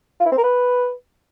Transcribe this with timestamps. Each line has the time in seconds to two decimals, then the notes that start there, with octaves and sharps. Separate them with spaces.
0.20 F4
0.26 E4
0.32 C4
0.38 A#4
0.44 B4